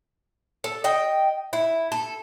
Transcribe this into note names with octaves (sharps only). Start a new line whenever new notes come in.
A4
D#5 G5
E4
A4